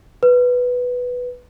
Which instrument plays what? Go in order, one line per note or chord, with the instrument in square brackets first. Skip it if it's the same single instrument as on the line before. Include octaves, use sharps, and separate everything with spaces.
[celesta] B4